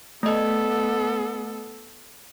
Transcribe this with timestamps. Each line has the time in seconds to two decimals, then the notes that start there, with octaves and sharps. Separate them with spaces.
0.23 A3 B3 A4 D#5